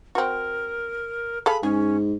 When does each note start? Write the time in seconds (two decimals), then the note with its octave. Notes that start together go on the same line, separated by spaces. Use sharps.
0.15 C4 F#4 A#4
1.46 G#4 A4 F5 B5
1.63 G#2 C#4 G#4